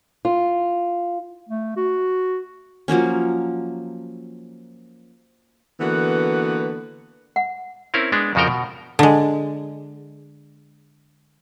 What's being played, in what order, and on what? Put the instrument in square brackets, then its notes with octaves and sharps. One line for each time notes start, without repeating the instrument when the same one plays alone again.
[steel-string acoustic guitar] F4
[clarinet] A3
F#4
[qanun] F3 F#3 A#3 C#4
[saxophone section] D3 E3 A#3 B3 F#4 B4
[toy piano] F#5
[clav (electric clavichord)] C4 C#4 E4 A#4
G#3 B3 D4
F2 C#3 F3 F#4 A#4 G5
B2
[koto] D3 G#3